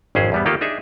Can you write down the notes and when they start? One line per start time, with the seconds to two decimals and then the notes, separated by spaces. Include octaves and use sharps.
0.15 G#1 F2 C#4 G#4 C5
0.32 E2 G3 B3
0.46 D#3 A#3 F4 G4 A4
0.61 D4 D#4 G#4 E5